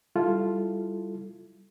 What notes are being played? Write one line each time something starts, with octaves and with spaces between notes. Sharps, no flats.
G3 E4 F4 A4